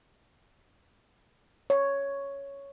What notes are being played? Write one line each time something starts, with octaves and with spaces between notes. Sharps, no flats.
C#5